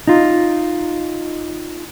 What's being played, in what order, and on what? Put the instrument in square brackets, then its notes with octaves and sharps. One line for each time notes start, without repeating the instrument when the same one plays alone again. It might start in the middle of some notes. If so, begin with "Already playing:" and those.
[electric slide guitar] D#4 F4